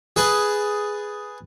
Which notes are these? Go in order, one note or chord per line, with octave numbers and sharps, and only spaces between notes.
G#4 B4 G#5 A5